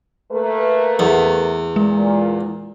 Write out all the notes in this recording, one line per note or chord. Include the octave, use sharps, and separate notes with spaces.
A3 A#3 B4
E2
A#2 G#3